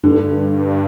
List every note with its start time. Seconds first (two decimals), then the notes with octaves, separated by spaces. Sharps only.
0.03 G2 D3